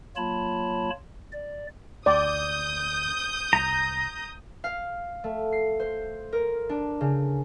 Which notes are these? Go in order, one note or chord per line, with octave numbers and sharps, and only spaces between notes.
F#3 A#3 F4 C#5 A5 B5
D5
D2 D5 D#6 G6
C2 A#5
F5
A3
C7
C5
A#4
D4
C#3